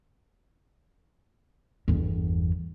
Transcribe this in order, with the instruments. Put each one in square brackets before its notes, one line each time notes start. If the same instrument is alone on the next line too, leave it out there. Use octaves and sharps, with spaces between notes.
[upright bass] G1 E2